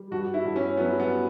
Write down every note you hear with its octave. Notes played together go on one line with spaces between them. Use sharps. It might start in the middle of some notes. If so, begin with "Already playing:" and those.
Already playing: G3
G2 F#4
E4
G2
C#4
F#3 B3
B3